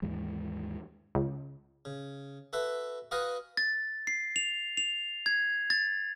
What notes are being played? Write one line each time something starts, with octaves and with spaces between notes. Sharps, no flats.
D#2 G#2 E3 G#3
C#2
C#3
F#4 A4 B4 E5
F#4 B4 D#5 F5 F#5 G#5
A6
C7
F7
F7
G#6
A6